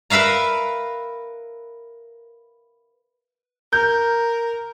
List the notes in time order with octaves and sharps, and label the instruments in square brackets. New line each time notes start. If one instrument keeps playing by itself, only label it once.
[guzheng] A#4 B4 E5 F5 A#5
[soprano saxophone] A#4 [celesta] A#5 F6 [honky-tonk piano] G6